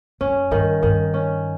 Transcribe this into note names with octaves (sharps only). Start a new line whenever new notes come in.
F#2 C#4
G2 D#3
G2 D#3
C#4